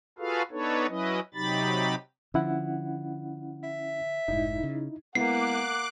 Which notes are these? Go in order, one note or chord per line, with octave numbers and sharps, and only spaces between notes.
F4 F#4 G#4 A4 B4 F5
B3 D4 D#4 A4 B4 C#5
F#3 C#4 E4 B4 D#5
C3 F#3 D#4 G4 B5 A6
D3 F3 C#4 E4 F#5
E5
F1 G#2 D#4 E4
C#3
G#3 A#3 B3 E4 F#5 D6 F#6 C7